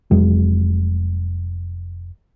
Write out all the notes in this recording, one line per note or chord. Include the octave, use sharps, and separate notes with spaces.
F1 F2 F#3 G#3